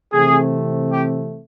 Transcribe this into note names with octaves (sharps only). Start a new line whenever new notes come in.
C3 E3 A3 C4 G#4
G4